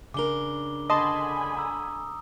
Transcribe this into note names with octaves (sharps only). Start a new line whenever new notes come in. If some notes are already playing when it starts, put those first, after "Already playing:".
C#3 D4 A#4 D6 G7
D3 D#5 G#5 A5 B5 C6 D#6
A#5 E6